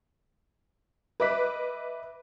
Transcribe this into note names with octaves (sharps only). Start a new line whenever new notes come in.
B4 D#5 E5 D6 F#6 B6